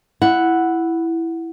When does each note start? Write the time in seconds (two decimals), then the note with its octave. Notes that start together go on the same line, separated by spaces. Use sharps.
0.22 E4 F#5